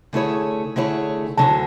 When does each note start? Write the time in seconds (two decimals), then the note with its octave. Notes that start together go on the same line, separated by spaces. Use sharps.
0.13 D3 A3 E4 G#4 C#5
0.76 D3 A3 E4 G#4 C#5
1.37 D2 D3 F#3 A5